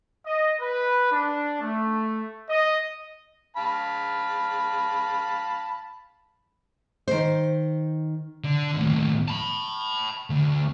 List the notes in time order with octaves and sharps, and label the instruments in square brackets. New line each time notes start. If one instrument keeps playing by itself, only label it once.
[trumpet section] D#5
B4
D4
A3
D#5
[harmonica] F5 A5 B5
[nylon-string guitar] D#3 C5
[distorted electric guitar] D3
D#2 A2
A5 B5
D2